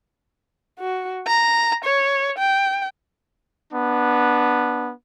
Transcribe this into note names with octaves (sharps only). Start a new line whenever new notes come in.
F#4
A#5
C#5
G5
B3 D4